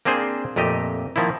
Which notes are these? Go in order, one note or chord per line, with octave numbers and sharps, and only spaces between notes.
A#3 C4 D4 G#4 C5
F2 A#2 A3 G4 D#5
D#3 F3 A#3 D#4 E4